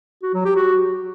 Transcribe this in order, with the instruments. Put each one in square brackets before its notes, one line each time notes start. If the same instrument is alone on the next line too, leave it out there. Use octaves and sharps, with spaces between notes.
[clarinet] F#4
F#3
G4
F#4